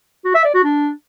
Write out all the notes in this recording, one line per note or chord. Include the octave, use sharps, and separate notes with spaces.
F#4
E5
D5
F#4
D4